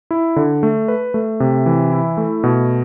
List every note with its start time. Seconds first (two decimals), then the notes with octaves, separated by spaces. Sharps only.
0.11 E4
0.36 D3
0.63 A3
0.88 B4
1.14 A3
1.40 C3
1.66 E3
1.92 E4
2.17 A3
2.44 B2